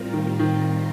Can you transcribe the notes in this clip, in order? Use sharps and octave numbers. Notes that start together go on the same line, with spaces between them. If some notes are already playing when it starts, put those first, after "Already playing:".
Already playing: A2 G3 C4 F4 A#4
D#3
D#3